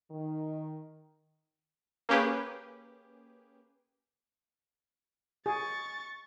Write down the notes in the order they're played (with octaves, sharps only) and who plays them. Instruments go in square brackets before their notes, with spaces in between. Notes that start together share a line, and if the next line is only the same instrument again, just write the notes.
[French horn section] D#3
[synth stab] A#3 C#4 G4 G#4 B4
[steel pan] G#4 [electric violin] C#6 A6